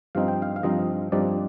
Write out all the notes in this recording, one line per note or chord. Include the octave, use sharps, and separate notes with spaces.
G2 F3 C4 D#4 F5
G5
F5
F5
G2 F3 C4 D#4 D#5
G2 F3 C4 D#4 D5